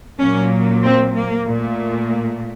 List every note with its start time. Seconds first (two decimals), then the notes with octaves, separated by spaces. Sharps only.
0.20 A#2 F#3 A#3 C#4
0.84 C4
1.15 A#3
1.47 A#2 A3